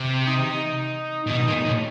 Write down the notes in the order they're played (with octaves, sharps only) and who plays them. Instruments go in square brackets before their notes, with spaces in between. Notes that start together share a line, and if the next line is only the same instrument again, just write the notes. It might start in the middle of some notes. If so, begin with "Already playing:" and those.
Already playing: [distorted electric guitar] C3
[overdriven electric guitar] D#4
[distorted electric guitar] A#2
[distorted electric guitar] B2 [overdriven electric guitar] D#4
[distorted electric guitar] A#2
A2